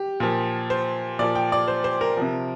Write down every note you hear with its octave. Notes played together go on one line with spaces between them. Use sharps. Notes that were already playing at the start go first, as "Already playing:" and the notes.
Already playing: G4
A#2 F3
C5
A#2 F3 D5
G5
D5
C5
C5
A#4
C3 F3